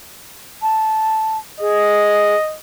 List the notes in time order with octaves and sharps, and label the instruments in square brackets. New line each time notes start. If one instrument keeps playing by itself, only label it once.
[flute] A5
[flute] G#4 [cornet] D#5